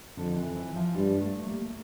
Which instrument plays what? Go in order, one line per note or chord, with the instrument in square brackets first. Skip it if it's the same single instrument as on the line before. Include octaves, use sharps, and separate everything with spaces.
[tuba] F2 [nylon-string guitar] D3
[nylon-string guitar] E3
E3
F3
[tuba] G2 [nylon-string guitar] G3
[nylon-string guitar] A3
A#3